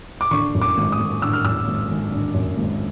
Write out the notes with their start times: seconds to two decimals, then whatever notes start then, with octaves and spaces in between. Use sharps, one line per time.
0.21 D6
0.31 D3 C#6
0.55 F#2
0.61 D6
0.77 G#1
0.92 D#6
0.99 G#1
1.22 D3 E6
1.33 F6
1.44 F#2 E6
1.67 G#1
1.90 G#1
2.12 D3
2.34 F#2
2.57 G#1